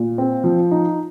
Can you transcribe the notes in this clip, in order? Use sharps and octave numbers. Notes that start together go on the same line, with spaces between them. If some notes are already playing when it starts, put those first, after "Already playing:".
Already playing: A#2
C4
F3
D#4